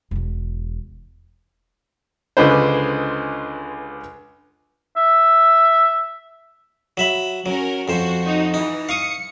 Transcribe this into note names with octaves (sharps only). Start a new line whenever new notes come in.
E1 E2
C#2 D3 G#3 B4 C5
E5
F#3 E5 B5
F#3 C#4 A#4
F2 F#4 C5
D#4 F#4
E3 D#4
F5 C#6 D#6 C#7